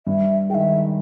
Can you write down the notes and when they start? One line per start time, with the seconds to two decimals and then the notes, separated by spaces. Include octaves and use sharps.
0.06 G2 E5
0.50 G#3 G5
0.53 D#3 E5